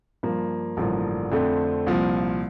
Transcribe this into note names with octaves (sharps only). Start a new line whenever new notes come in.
G2 F3 A#3
A1 G2 D3 F3 A#3
F2 D3 A3 C4
C2 A#2 F3